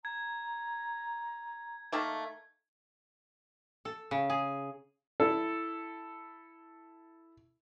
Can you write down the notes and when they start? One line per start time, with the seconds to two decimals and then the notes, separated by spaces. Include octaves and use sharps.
0.05 A#5 G#6
1.92 D#3 A3 A#3
3.85 A4
4.11 C#3
4.30 G#4
5.20 E4 A4